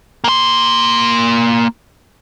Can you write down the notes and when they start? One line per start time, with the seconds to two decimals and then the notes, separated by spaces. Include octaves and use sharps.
0.24 A#3 C6